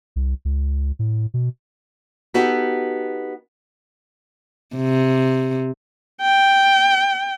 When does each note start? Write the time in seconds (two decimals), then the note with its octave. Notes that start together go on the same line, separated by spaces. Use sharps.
0.16 C2
0.45 C#2
0.99 A2
1.34 B2
2.34 B3 D#4 F#4 G4 A4
4.76 C3
6.22 G5